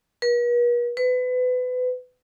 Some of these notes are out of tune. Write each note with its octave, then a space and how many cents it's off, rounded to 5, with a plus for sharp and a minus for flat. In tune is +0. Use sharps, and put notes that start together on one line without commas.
B4 -45
B4 +30